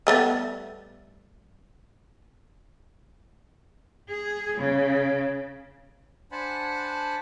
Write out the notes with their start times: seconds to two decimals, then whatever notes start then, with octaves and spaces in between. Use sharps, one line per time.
0.07 G3 A3 B3
4.08 G#4
4.56 C#3
6.32 D4 C5 F#5 G#5 A5 B5